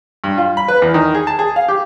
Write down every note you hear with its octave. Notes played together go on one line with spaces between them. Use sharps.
G2
F4
B5
B4
E2
D#3
G#4
A5
G#4
F5
G4